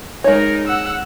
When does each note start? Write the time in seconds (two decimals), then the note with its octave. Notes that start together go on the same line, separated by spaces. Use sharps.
0.24 G#3 D#4 A#4 C#5
0.67 F#5 E6